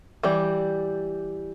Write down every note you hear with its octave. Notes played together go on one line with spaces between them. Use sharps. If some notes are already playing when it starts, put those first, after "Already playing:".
E3 G3 G4 D5